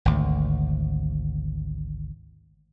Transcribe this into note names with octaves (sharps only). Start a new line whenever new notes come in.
G#1 D2